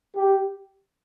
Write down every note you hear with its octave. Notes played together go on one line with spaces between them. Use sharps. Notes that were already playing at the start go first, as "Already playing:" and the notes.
G4